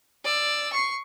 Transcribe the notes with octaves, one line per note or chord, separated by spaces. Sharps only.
D5 E6
C#6 C7